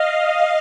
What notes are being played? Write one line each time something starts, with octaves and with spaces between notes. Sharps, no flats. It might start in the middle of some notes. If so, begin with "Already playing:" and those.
Already playing: D#5 F5